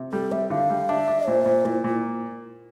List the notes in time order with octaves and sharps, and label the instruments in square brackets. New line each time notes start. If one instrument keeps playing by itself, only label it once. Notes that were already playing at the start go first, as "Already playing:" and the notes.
Already playing: [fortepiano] C3
[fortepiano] G3 [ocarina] A4
[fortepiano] G3 [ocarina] E5
[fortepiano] D3 [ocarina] F5
[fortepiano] G3
[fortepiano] D4 [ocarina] E5
[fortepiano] D4
[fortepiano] A#2 [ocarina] C5
[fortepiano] A#2
[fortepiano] A#2 [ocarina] E4
[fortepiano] A#2 [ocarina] E4